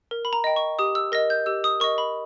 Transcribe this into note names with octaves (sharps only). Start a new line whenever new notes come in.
A#4
B5
A#5
D#5 G5
C#6
G4 D#6
E6
A#4 D#5 A#6
G6
G4 E6
D#6
A#4 D#5 C#6
B5